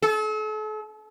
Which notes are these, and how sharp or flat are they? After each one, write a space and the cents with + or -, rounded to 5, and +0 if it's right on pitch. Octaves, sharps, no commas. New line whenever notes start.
A4 -40